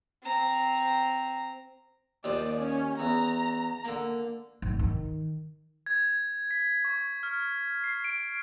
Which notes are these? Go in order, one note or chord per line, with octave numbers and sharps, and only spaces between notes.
C4 A#5
D#2 F3 D5
C#4
E2 A#5
D3 A#3
G#1
D#3
G#6
B6
C#6
F6
C7
D7